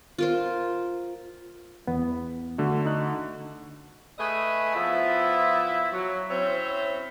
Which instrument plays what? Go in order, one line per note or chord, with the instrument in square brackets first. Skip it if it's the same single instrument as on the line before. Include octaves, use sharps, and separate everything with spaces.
[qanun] F4 A#4 C5
[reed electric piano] E2 B3
[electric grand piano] D3 A3 F#4
[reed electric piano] D#4 F#6
[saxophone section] A3 G#4 B4 D#5 E5
F3 B3 E4 F4 E5
F#3
C4 C#4 E4 C5 C#5